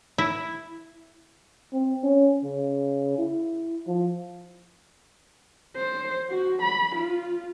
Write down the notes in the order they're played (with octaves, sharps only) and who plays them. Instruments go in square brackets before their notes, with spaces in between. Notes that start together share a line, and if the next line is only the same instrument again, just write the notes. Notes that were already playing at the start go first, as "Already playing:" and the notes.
[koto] E4
[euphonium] C4
C#4
C#3
E4
F3
[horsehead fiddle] C5
F#4
B5
F4